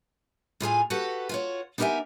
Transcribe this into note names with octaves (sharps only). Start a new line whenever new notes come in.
A2 F4 G#4 G#5
F#4 G4 A4 B4 F#5
F4 F#4 C#5
B3 D#4 G4 A#4 E5 G#5